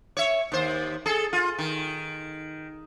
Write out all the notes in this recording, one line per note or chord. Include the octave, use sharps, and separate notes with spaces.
C#5 E5
D#2 C5
G#4 A4
F4
D#3